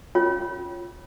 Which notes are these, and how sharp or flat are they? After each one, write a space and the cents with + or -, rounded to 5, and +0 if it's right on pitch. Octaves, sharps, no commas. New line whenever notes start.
C#4 +0 F4 +0 C#5 -15